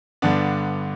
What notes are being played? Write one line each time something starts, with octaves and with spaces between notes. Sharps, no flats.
G2 D3 B3 D4